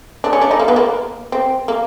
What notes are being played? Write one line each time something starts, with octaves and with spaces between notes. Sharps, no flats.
D4
C#4
D4
D#4
A#3
B3
A#3
C4
A#3